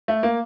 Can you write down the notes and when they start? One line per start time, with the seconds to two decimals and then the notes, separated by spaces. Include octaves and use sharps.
0.08 A3
0.23 A#3